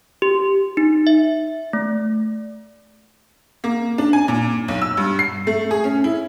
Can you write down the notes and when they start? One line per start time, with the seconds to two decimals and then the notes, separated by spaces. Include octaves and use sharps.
0.22 G4
0.77 D#4
1.07 E5
1.73 A3
3.64 A#3
3.98 D4
4.13 G#5
4.28 A#2
4.68 B1
4.82 E6
4.97 G2
5.19 C7
5.47 A3
5.71 G#4
5.84 C#4
6.04 E4